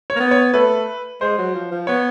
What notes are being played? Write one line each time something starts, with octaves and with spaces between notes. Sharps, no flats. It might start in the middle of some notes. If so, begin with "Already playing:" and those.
C#5
A#3
B3
C#5
A3 B4
G#3 C5
F#3
F3
F3
B3 C#5